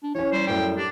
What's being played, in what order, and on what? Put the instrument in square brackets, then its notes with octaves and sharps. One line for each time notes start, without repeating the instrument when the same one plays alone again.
[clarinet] D4
[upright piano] E3 C#4 [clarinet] C#5
[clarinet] G3 [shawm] C5
[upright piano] F#2 A2 [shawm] G5
[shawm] D4 [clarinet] G4